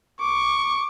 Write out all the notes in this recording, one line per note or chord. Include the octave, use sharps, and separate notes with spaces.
C#6 D6